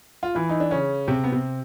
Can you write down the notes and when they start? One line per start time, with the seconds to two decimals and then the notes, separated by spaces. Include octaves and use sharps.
0.23 F4
0.35 E3 E4
0.50 D#4
0.60 D4
0.71 C#3 C#4
1.08 C3 C4
1.24 B3
1.32 C3 C4